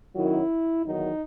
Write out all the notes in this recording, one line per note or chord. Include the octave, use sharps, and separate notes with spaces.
F#2 D#3 F#3 E4
E2 D#3 F#3 D#4